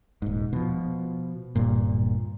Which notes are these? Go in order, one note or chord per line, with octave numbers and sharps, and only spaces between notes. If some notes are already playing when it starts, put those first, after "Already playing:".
D#1 G#2
B2 F3
D1 G2 A#2